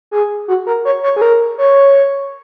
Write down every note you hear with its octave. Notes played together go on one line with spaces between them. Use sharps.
G#4
F#4
A#4
C#5
C#5
G#4
A#4
C#5